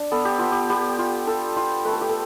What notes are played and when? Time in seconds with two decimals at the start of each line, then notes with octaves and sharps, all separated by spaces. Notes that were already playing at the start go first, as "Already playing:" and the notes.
Already playing: D4
0.11 B3 A4
0.25 G4
0.39 B3 F4
0.52 G4
0.69 B3 G4
0.98 F4
1.27 F4 A4
1.56 F4
1.85 A3 B4
1.93 A4
2.01 G4
2.09 A4